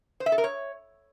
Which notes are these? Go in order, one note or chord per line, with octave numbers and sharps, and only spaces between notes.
C5
E5
A4
A#4
C#5